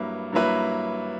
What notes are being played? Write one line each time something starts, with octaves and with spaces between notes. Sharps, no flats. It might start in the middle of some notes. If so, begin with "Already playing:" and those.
Already playing: G2 F#3 A#3 E4 B4
G2 F#3 A#3 E4 B4